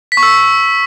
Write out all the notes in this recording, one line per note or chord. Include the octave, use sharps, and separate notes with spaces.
B6
C#6
E6